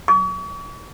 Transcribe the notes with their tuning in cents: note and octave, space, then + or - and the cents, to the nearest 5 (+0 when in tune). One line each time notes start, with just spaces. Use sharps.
C#6 +45